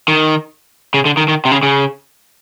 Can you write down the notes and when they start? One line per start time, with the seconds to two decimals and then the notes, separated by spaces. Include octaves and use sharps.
0.08 D#3
0.94 C#3
1.05 D3
1.17 D#3
1.28 D#3
1.45 C3
1.51 C#3
1.63 C#3